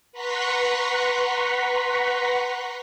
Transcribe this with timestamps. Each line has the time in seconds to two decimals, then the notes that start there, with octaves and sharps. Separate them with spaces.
0.12 B4 F#5 A#5 C6 C#6 B6